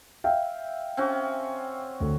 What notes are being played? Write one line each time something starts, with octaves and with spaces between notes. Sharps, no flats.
E5 F5 G5
C4 C#4 F#4
D2